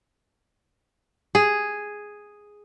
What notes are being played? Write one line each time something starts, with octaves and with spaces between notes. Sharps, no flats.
G#4